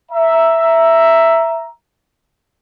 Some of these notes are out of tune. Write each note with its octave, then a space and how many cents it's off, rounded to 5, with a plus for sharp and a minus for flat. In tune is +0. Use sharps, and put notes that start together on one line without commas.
E5 +5 A#5 +0